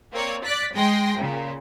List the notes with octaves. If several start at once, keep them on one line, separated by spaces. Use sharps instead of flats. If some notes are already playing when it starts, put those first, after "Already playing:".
A#3 C4 C#5 D5
D5 D6 F#6 A6 B6
G#3 G#4 G5 C6 A#6
A#2 C#3